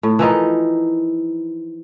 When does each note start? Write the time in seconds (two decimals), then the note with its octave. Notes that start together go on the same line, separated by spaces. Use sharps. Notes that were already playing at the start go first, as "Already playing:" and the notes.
0.03 A2
0.19 E3 F3 D#4 A#4